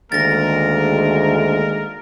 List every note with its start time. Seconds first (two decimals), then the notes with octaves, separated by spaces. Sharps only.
0.12 D2 D#3 G#3 A#3 A#4 A6 A#6